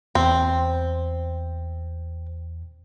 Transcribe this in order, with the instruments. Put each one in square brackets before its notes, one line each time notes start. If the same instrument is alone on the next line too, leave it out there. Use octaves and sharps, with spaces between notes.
[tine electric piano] E2 [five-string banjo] C4